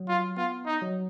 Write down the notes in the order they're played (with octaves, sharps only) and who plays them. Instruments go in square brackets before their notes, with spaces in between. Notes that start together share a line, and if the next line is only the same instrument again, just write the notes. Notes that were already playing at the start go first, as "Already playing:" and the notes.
Already playing: [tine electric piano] F#3
[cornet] F4
[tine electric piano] B3 [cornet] F4
[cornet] D#4
[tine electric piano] F#3